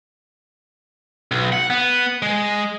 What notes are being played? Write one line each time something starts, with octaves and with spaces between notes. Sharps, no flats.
B1
F#5
B3
G#3